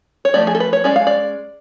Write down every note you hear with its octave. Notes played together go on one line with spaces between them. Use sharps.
C#5
F3 A3 D5
G#4
A4
B4
C#5
G#3 C#4 D5
F5
D5